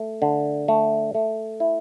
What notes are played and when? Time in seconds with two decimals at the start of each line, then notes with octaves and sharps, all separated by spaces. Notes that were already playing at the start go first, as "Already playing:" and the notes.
Already playing: A3
0.22 D3
0.68 A3
1.15 A3
1.60 E4